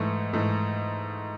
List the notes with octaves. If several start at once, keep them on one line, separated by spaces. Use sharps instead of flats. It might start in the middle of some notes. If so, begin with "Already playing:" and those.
Already playing: G#2 E3 A3
G#2 E3 A3